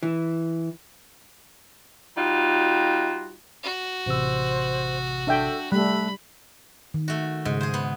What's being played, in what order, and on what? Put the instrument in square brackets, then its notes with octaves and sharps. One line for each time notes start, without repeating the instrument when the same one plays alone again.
[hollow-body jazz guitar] E3
[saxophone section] G3 D#4 F4 F#4
[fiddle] F#4
[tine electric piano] A1 C3 E6 [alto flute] C5
[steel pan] D4 E5 G5 [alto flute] A4
[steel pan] G3 [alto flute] A3 [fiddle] B5 [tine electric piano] F#6
[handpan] D#3
[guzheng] A3 F#4
[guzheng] G#2 [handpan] C#3 G#3
[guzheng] G#4 C5
B3